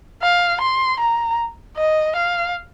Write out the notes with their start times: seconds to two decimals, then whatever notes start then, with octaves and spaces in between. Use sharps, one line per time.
0.22 F5
0.61 C6
1.00 A#5
1.77 D#5
2.16 F5